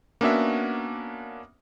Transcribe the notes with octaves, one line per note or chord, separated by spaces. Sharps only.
A#3 B3 C#4 D4 F#4 E5